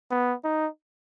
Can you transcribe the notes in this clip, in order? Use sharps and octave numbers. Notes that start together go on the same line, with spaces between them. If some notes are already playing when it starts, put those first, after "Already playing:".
B3
D#4